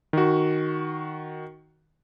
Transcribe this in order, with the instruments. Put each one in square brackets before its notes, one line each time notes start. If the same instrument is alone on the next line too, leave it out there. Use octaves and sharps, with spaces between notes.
[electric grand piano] D#3 F#4